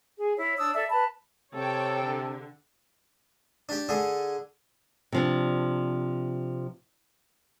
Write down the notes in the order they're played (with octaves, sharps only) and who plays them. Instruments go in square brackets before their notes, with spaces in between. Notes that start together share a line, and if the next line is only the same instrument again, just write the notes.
[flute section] G#4
E4 C#5
D4 C#5 D#6 E6
A4 D5 E5
B4 A5 B5
[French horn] C3 [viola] A4 [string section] C#5 G5
[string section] D3
[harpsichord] D4 G4
D3 D4 G#4
[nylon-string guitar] C3 F3 D4